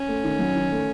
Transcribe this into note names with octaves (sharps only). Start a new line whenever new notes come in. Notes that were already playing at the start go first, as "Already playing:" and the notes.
Already playing: C#4
A3
D#3
F#3
D#3
A3